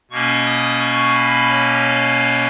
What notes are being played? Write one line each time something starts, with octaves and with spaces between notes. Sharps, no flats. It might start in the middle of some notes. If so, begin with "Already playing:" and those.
B2 A#3 C#4 C#6
D#6
C#6
B5
C#5